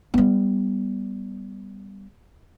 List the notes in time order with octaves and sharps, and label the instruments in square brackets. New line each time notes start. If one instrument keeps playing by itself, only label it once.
[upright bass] G3 B3